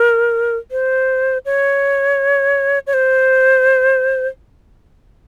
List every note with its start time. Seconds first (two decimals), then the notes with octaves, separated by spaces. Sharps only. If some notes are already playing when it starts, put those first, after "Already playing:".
Already playing: A#4
0.71 C5
1.45 C#5
2.87 C#5
2.93 C5